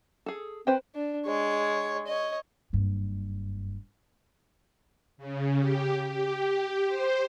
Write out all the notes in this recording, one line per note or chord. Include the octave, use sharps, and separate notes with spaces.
G#4 A4
C4 B4 C5 G5
D4
G#3 C#5
C#5 D#5
F#1 G2
C#3
G4
G4
C5